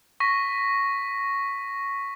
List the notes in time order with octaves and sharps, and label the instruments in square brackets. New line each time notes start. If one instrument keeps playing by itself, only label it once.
[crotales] C#6 A#6 B6